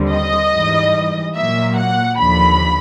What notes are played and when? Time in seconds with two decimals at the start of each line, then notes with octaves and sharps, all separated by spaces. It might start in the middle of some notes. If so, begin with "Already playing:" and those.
Already playing: D#2 D3 G3 C4
0.11 D#5
0.52 G#2 E3 G3
1.35 A#2 F#3 A#3 E5
1.77 F#5
2.19 D#2 D3 F3 B5